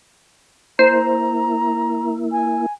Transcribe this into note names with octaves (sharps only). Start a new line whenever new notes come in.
A#3 E4 C5 A#5
G#5